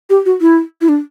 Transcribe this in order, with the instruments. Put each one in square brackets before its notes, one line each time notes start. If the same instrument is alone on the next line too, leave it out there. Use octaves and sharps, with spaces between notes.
[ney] G4
F#4
E4
E4
D4